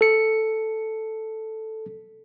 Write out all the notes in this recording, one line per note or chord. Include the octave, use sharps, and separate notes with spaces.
A4 C#7